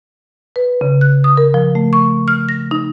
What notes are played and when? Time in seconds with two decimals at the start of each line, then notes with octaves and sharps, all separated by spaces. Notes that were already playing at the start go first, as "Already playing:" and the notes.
0.56 B4
0.81 C#3
1.01 F#6
1.24 D#6
1.37 A#4
1.54 F3
1.75 A3
1.93 C#6
2.28 F6
2.49 A#6
2.71 D#4